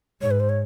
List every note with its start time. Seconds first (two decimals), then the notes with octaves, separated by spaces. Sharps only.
0.22 G#2 C#5
0.31 B4
0.40 C5
0.49 C#5